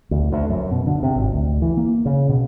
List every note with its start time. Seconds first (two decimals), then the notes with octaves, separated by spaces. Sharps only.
0.11 D2
0.32 D2
0.50 F#2
0.71 B2
0.87 D3
1.03 C3
1.16 G#1
1.33 D2
1.62 E3
1.77 A#3
2.06 C#3
2.29 B2